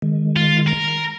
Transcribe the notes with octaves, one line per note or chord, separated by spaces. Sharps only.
D#3 G#3
F4
A#4